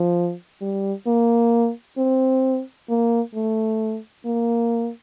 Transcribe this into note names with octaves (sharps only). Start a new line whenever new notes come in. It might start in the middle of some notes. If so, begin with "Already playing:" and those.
Already playing: F3
G3
A#3
C4
A#3
A3
A#3